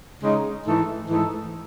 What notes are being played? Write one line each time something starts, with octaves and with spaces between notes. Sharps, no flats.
C#3 G#3 D#4
G#2 E3 A3 D#4 A4
G#2 E3 A3 D#4 A4